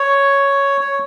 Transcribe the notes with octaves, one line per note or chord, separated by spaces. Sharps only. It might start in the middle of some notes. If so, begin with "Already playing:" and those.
Already playing: C#5
C#5